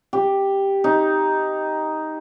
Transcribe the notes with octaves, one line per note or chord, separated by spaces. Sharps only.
G4
D#4